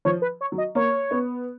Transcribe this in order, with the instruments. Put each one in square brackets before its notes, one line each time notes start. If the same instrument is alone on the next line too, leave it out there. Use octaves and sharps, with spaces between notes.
[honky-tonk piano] F3 [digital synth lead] C#5
[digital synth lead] B4
C#5
[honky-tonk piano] F#3
[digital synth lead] D#5
[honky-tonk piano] A#3 [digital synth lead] C#5
[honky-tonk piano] B3